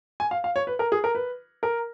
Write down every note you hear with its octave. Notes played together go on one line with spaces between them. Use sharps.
G#5
F5
F5
C#5
B4
A#4
G#4
A#4
B4
A#4